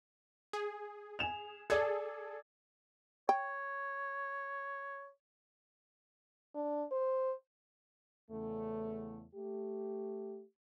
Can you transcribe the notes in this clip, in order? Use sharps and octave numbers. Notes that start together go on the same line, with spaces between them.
G#4
G#5 E7 F7
G#4 A4 D5 G#6
C#5 G5
D4
C5
E2 C#3 A3
A3 G4